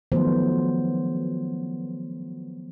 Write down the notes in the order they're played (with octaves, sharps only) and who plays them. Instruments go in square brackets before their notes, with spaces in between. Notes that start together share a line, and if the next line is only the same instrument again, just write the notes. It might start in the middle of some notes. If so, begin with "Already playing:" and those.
[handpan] D#3 F3 F#3 A3 B3 C5